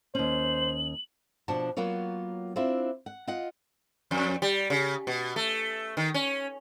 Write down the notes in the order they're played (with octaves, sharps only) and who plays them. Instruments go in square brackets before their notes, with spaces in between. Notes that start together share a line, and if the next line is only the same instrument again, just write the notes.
[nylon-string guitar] D#2 C#4 [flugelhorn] C5 [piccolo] F#7
[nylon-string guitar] B2 F3 D4 F#4 A5
F#3 A#3 B3 F4 C#5
C4 D4 E4 F4 E5
F#5
F4 D#5 F#5
[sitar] F2
G3
C#3
B2
A3
D#3
C#4